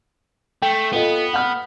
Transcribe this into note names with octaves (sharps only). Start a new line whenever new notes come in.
A3 G5
B3 F4 A4 D#5
F#5 F6